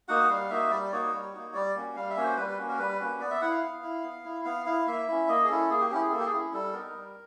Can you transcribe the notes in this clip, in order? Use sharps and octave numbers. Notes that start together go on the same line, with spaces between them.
A#3 D#4 F#4 F#5
G3 F5
A#3 D#4 F#4 E5
G3 D5
A#3 D#4 F#4 C#5
G3
A#3 D#4 F#4
G3 D5
A#3 C#4 F#4
G3 F5
E5
A#3 C#4 F#4 C#5
C5
G3 B4
B4
A#3 C#4 F#4
A#4
G3 B4
A#3 C#4 F#4
B3 D5
E5
E4 F#5
F5
B3
E4
B3
E4
B3 F5
E4 F5
A#3 E5
C#4 E4
A#3 D#5
G#4
C#4 E4 A4
A#3 G#4
G4
C#4 E4 G4
G#4
A#3 A4
G4
G#4
C#4 E4
G3 A4
B3 D#4 A#4
G3